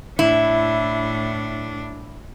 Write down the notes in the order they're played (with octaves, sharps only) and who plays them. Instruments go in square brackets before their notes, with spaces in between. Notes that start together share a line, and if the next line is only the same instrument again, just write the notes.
[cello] A2 D4 [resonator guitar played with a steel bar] E4